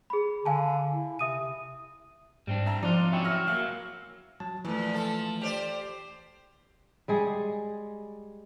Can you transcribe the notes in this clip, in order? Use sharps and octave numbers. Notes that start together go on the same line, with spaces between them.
G#4 B5
D3 F5 G#5 A5
E4
C3 E5 D#6 D#7
G#2 G3 C4 D4
E5 A5 A#5
F3 C4 D#4 F4 D5 F#6
F#3 C#4 E4 E5 G5
F#4 E6 F6 A#6
F#3 G3 A#3 F5
F#3 A5
A#2 E3 F3 A3
F3 A4
G4 C5 D5
G3 G#3 G#4